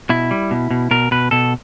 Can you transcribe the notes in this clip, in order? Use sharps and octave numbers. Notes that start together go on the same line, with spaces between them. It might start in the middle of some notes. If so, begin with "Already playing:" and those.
B2 E4
G3
B2
B2
B2 A#4
B2 B4
B2 A4